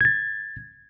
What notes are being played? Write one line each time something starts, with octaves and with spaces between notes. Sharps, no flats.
G#6 A6